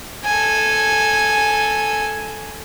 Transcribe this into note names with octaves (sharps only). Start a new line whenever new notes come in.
A4 G#5